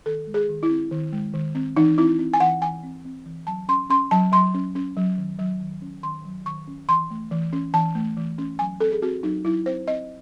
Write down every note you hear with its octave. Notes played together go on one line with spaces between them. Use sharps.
D#3 A4
G#3
G#4
D#3
E4
C4
D#3
G#3
D#3
C4
E3 D#4
C4 E4
C4
G#5
E3 F#5
E3 G#5
C4
C4
E3
F#3 A5
C#4 C6
C#4 C6
F#3 A5
F#3 C6
C#4
C#4
F#3
D#3
F#3
D#3
C#4
D#3 C6
F#3
D#3 C#6
C#4
E3 C6
A3
E3
C#4
E3 A5
A3
E3
C#4
F#3 G#5
C4 A4
G#4
C4 F#4
F#3 D#4
F#3 E4
C4 C5
C4 D#5